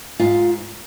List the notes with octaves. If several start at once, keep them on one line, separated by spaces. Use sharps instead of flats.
G#2 F4